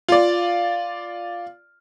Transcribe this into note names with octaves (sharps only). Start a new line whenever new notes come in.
F4 D5